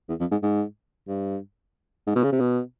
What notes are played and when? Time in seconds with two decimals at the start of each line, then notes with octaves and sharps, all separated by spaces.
0.09 E2
0.20 F2
0.31 G#2
0.43 G#2
1.08 G2
2.07 G#2
2.15 B2
2.24 C#3
2.32 C3
2.40 B2